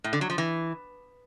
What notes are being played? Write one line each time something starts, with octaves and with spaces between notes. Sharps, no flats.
A2
D3
F#3
F3
E3